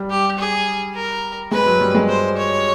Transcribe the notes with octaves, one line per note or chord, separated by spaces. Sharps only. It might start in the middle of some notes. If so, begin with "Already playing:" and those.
Already playing: G3
G4
G#4
A#4
G#3 B4
F#3
G3
G#3
C5
C#5